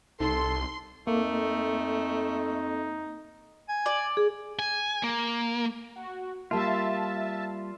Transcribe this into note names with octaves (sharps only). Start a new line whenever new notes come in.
C2 D#4 A4 C6
F2 A3 A#3 D#4
G#5
D5
G#4
G#5
A#3
F#4
G3 A#3 F4 E5 A5